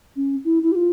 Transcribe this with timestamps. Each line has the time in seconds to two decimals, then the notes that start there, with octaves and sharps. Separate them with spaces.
0.16 C#4
0.44 E4
0.63 E4
0.72 G4
0.75 F4